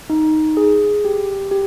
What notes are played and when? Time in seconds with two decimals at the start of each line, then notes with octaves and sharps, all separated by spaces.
0.10 D#4
0.57 G#4
1.05 G4
1.51 G4